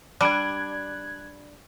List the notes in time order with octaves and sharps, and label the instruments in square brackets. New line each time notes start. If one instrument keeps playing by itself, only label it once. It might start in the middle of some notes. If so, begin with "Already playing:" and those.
[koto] G3 [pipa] D4 [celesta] B5 D7 [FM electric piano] F#6 G#6